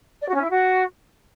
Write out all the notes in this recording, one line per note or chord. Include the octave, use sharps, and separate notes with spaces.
D5
F#4
C#4
E4
F#4